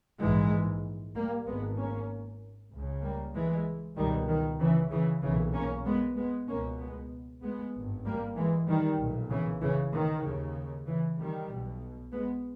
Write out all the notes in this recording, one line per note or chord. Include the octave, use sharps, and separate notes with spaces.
A#1 G#2 E3 G#3
G3 A#3
G#1 G#2 G#3 B3
A#3 C#4
C#2 C#3
G3 A#3
E3 G#3
C#2 B2 D#3 G3
D#3
C#3 E3
C#3 E3
B1 A#2 C#3 E3
A#3 C#4
G#3 B3
G#3 B3
C#2 B2 A#3 C#4
G#3 B3
G#3 B3
G#1 G2
G3 A#3
E3 G#3
D#3 G3
B1 A#2
C#3 E3
C#3 E3
D#3
D#2 C#3
C#3 E3
D#3 G3
B1 B2
G#3 B3